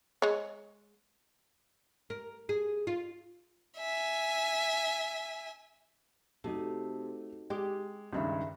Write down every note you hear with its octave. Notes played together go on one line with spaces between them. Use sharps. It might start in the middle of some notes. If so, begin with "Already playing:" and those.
G#3 C#5
A#4
G#4
F4
E5 G#5
C3 A3 D#4 F#4 A4
G#3 G4
C#2 G2 D#3 G#4 C#5 E5